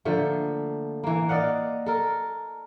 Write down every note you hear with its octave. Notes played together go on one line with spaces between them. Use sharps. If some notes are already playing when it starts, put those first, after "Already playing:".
D3 F3 A3 A#3
E3 A#3
D5 D#5 F5 F#5
A4 A#4